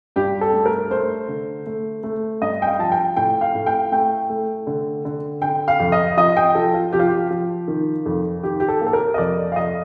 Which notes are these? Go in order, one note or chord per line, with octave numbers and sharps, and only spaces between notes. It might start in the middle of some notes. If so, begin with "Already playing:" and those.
G2 G4
A4
A3
A#4
A3 C5
D3
A3
A3
G2 D#5
G5
F5
F3 A5
G5
A2 G5
F5
A2
G5
A3 G5
A3
D3
D3
D3 G5
F5
F2
D#5
F3 D#5
G5
F3 A4
F4
F3 G4
F4
G4
F3
D#3
F2
D#3 G4
G4
A4
A#3
A4
A#4
D#5
F2 D5
F5
F2 D#5